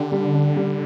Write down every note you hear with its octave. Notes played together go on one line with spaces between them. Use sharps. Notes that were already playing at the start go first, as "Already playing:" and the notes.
Already playing: D3 D4 G4
G3
D4
G3